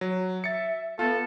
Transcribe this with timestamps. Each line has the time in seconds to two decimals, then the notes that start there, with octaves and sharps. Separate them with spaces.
0.01 F#3
0.44 E5 A6 C#7
0.99 B3 F4 A4